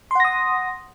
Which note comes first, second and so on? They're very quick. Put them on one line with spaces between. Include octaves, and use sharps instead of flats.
C6 F#5 A#6 D#6